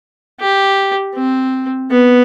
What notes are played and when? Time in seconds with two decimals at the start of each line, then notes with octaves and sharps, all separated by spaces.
0.40 G4
1.15 C4
1.90 B3